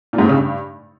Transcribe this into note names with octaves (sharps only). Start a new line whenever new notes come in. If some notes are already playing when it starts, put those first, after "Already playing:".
A#2
G#2
A2
C#3
G2